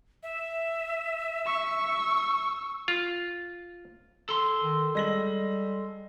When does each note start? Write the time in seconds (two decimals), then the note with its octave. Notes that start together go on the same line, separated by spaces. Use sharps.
0.23 E5
1.46 C#6 E6
2.88 F4
4.29 A4 C6
4.63 D#3
4.95 G3 G#3 A#6 F#7